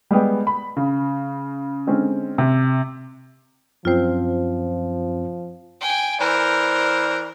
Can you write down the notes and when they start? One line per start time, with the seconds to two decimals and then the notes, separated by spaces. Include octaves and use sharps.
0.11 G3 G#3 B3 G5
0.47 B5
0.77 C#3
1.87 D3 G#3 C4 C#4
2.38 C3
3.85 F#2 F3 C4 F4 C5
5.81 G5 G#5
6.20 E3 A#4 C5 D5